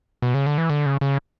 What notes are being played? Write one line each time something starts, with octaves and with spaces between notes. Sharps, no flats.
B2
C#3
D3
E3
D3
C#3
C#3